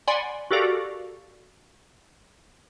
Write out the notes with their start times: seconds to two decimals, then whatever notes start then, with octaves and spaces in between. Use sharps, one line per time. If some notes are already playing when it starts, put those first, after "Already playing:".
0.08 D5 F#5 G#5 B5 C6
0.51 F#4 G4 A4 A#4 D5 F5